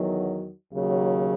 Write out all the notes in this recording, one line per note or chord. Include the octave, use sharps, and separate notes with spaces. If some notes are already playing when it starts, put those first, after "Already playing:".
Already playing: E2 D#3 F#3
D#2 C#3 F#3